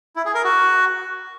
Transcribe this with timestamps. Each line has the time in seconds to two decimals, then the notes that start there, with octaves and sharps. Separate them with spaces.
0.16 E4
0.25 G#4
0.35 A#4
0.44 F#4